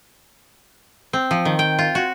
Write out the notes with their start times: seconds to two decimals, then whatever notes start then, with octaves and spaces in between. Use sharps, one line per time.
1.13 C4
1.31 F3
1.45 D#3
1.59 G5
1.79 F4
1.95 F#4